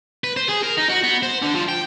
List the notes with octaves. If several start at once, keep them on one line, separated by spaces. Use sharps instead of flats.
B4
C5
G#4
A#4
D#4
F#4
B3
C5
D3
F3
G5